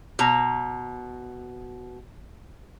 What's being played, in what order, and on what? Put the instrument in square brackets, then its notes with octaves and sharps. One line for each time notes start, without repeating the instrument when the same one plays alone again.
[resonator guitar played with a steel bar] B2 A#5